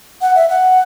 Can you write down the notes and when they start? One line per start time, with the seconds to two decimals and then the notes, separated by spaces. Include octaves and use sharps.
0.21 F#5
0.36 E5
0.50 F#5